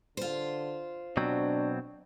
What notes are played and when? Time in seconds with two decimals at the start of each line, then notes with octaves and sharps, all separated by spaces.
0.17 D3 F4 C5
1.17 B2 F#3 C4 D4